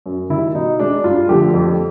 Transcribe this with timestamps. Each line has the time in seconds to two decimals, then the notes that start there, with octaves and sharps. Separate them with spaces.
0.06 F#2
0.30 D#3 G3 E4
0.55 B2 D#4
0.79 G#3 D4
1.04 G2 F4
1.29 D3 F3 A3 G4
1.54 F2